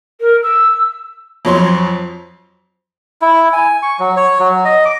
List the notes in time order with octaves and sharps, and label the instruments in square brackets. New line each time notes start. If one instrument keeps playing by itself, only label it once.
[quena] A#4
E6
[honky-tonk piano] F2 F#3 C#5 C6
[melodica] E4
G#5
C#6
F#3
C#5
F#3
D#5
D6